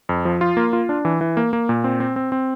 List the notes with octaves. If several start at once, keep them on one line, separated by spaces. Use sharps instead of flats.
F2
F3
F4
A#3
F4
D4
E3
E3
A#3
A#3
A#2
C4
C4
C4
C4